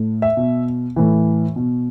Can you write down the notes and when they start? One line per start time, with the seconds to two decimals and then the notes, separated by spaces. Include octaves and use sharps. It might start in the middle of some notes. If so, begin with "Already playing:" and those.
Already playing: A2
0.22 E5
0.37 B2
0.96 A2 E3
1.56 B2